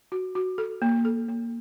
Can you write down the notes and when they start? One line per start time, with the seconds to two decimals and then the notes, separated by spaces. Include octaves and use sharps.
0.12 F#4
0.35 F#4
0.58 A4
0.82 A#3
1.05 A4
1.28 A#3